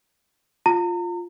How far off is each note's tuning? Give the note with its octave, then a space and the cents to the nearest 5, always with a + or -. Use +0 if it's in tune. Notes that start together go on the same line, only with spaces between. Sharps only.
F4 +0 A#5 -40